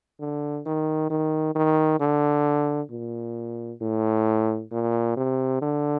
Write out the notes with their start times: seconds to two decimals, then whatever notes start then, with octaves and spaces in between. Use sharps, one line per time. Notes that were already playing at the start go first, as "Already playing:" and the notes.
0.20 D3
0.66 D#3
1.10 D#3
1.55 D#3
2.00 D3
2.91 A#2
3.82 A2
4.72 A#2
5.17 C3
5.62 D3